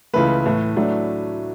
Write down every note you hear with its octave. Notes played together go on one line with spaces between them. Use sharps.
C#2 C#3 E3 A3 B4
A2 E3 A3
A2 F#3 A3 D4